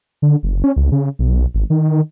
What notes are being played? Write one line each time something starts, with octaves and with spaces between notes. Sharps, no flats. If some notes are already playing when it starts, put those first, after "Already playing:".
D3
F#1
C#4
C#2
C#3
B1
G#1
D#3